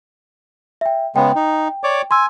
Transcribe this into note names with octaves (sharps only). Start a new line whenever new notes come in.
E5 G5
C#3 G#3 B3 G5
D#4
C#5 D5 D6
G#5 C6 E6